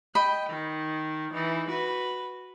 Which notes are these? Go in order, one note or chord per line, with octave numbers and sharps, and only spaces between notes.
D#5 G5 B5
D#3
E3 D#4
F#4 B4